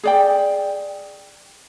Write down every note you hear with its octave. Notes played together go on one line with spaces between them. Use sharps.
G#4 D5 G5